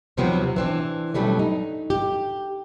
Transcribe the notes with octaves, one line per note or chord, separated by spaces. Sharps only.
D#2 C3 F3 F#3 B3 C4
E3 C4 D4
B2 F#3 G3 A3 C#4
D#4
G4